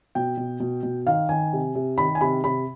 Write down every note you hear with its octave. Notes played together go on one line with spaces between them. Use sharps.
B2 G5
B2
B2
B2
D#3 F5
D#3 G#5
C3
C3
D#3 B5
G#5
C3 B5
C3 B5